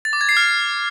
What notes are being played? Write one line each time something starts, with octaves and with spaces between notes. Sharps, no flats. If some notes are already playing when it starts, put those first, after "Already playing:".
A6
D6
G#6
C7
F6